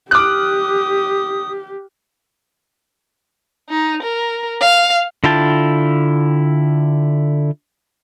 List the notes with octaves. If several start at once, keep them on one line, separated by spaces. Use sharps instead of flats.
G4 D6 D#6 F6 F#6
D#4
A#4
F5
D3 E4 F4 G5 A5